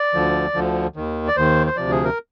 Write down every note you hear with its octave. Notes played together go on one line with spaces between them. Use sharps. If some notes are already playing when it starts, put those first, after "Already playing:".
Already playing: D5
D2 D3 F3
D2 D3 F3
D#2 D#3
D5
D#2 D#3 C5
C5
D2 C3 F3 D5
G#4
A#4